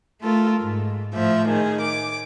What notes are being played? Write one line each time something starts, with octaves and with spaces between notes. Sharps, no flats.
A3 F4 A4 A#4
G#2
A2 F3 E5
D#3 G#4
D6